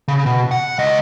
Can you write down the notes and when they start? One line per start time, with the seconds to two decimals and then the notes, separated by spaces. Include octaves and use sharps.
0.08 C#3
0.26 B2
0.51 F#5
0.79 C#2 D#5